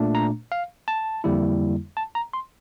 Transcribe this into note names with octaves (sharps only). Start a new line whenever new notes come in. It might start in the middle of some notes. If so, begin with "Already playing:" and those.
Already playing: A#2 A3 D4
A#5
F5
A5
F2 D3 G3 A#3 E4
A5
A#5
C6